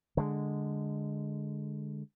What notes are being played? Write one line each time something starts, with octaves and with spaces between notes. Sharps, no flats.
D3 G#3